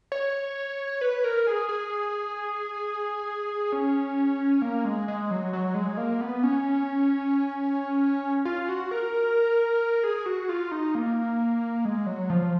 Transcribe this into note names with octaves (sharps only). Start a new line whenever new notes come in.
C#5
B4
A#4
G#4
G#4
C#4
A#3
G#3
G#3
F#3
F#3
G#3
A#3
B3
C#4
F4
F#4
A#4
G#4
F#4
F4
D#4
A#3
G#3
F#3
F3